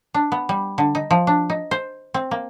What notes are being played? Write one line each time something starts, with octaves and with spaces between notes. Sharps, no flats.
D4
B3
G3
D3
D#4
F3
D4
D#4
C5
C4
A#3